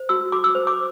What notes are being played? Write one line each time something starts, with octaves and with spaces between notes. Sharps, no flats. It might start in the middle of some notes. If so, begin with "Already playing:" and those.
Already playing: C5
F#4 E6
F#4 D6
E6
C5
D6